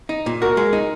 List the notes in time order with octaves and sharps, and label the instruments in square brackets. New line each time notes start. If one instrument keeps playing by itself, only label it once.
[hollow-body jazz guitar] D#4
A#2
[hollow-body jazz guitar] F#4 [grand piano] A#4
[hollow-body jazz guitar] G#3
D#4